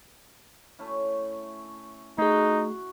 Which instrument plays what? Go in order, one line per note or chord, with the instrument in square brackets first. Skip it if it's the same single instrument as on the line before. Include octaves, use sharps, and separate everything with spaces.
[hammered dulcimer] A3 C#4 E4
[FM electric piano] A3 G#4 [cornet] D#4 [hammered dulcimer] F#4